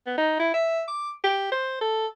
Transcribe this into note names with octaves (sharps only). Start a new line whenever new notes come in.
B3
D#4
E4
E5
D6
G4
C5
A4